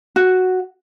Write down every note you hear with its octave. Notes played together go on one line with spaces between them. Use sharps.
F#4